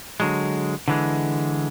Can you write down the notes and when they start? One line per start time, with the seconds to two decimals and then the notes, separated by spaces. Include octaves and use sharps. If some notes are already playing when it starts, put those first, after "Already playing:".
0.20 D3 F#3 G#3
0.88 D3 E3 G#3